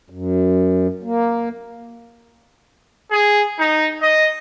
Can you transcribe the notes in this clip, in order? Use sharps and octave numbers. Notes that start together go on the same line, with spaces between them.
F#2
A#3
G#4
D#4
D#5